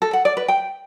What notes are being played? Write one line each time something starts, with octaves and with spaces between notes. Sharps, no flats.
A4
F#5
D5
B4
G5